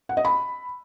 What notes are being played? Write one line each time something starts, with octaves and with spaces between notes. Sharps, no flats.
F#5
D#5
B5